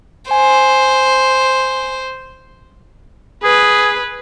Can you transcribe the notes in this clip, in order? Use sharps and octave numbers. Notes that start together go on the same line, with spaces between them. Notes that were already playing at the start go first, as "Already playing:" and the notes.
C5 G#5
G#4 B4